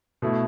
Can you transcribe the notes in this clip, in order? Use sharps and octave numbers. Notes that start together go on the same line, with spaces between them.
B2 A3 E4